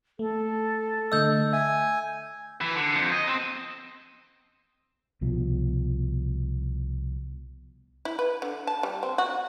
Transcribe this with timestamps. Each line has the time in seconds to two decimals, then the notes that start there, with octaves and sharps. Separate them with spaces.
0.19 A3 A4
1.12 D3 A3 D#5 E6 G6
1.53 E5 G#5
2.61 E3
2.75 D3
2.95 F2
3.12 D#5
3.27 C4
5.21 C2 B2 F3
8.05 E4
8.19 B4
8.42 D3
8.67 A5
8.83 G3
9.03 C4
9.18 F#4